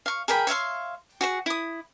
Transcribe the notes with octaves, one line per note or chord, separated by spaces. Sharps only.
F5 C#6
G#4 A#4 G5 B5
C#5 E5 F5 C6
F#4 G#4 F#5
E4 D#6